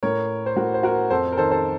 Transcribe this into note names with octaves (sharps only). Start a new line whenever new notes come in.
A2 A#4 C#5
C5
A2 F#4 A#4
C5
F#4 A#4
F2 A4 C5
A#4
D#3 A4 C5
A4 C5